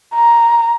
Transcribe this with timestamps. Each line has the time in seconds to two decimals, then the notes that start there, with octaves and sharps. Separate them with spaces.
0.14 A#5